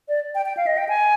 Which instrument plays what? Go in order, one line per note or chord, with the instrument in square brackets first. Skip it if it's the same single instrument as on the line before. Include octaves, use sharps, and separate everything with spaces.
[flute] D5
G5
G5
F5
D#5
G5
G#5